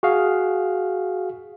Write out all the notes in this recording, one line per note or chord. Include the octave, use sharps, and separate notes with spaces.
F#4 G#4 F5